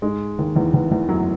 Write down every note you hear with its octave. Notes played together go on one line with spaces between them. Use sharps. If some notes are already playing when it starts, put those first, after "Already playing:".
G#2 G#3
D#2 D#3
E2 E3
E2 E3
E2 E3
F#2 F#3